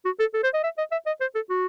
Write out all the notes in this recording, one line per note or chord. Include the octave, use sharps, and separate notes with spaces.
F#4
A4
A4
C5
D#5
E5
D#5
E5
D#5
C5
A4
F#4